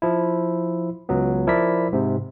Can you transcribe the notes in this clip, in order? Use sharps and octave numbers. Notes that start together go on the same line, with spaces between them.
F3 E4
C#2 F#3 B3
F3 E4 A#4 D5 B6
G#2 C3